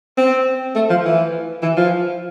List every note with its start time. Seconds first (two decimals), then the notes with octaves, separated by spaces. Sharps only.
0.18 C4
0.75 A3
0.90 F3
1.05 E3
1.62 E3
1.77 F3